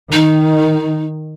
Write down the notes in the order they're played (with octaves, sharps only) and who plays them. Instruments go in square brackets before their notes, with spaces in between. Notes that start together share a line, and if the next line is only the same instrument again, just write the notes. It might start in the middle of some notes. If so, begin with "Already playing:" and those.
[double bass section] D#3 [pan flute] D#4